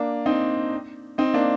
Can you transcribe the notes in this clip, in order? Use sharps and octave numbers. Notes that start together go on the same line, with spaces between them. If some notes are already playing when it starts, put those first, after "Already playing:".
Already playing: A#3 D4
C4 D#4
C4 D#4
A#3 D4